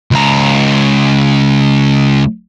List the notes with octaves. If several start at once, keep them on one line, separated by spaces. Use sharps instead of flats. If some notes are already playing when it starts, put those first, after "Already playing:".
C#2 A#5